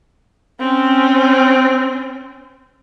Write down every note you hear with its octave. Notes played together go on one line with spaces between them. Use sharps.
C4 C#4